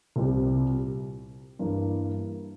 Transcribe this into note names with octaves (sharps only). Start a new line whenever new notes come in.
C2 A#2 G3 C4 G4
G2 E3 A#3